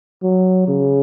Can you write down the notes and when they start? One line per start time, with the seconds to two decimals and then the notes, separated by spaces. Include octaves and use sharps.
0.23 F#3
0.68 C#3